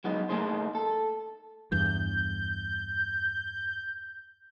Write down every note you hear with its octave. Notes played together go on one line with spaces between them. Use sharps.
F#3 G#3 B3 D#4
A3 A#3 D#4 G#4 C5
A4
E2 G2 G6